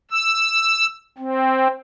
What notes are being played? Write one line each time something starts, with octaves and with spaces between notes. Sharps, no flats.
E6
C4